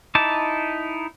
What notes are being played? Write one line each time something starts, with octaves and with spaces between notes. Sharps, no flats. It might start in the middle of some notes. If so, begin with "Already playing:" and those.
D#4 E4 A5 D6